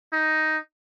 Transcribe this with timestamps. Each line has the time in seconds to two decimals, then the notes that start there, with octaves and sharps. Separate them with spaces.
0.13 D#4